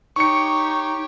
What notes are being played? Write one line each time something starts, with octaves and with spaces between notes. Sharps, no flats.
D#4 G4 C#5 C#6 C#7